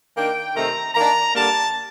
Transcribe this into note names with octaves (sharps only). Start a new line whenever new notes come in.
D#3 A#3 D4 G5
C3 D#3 A3 C4 A#5
D#3 A#3 D4 A#5
D3 G3 A#3 D4 A5